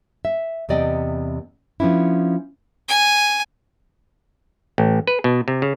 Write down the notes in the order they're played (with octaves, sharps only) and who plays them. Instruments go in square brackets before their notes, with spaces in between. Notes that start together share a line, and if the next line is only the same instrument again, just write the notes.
[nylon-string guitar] E5
E2 C3 B3 D5 D#5 G5
F3 B3 C#4 D4 E4
[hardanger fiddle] G#5
[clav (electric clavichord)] A1
B4
B2
C3
C#3